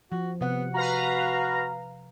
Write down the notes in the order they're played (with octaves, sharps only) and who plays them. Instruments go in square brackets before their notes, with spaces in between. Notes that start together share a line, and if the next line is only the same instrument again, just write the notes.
[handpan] F3 [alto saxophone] F#4
[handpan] C3 F#5 [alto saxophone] B3
[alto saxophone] F#4 [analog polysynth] B4 F5 A#5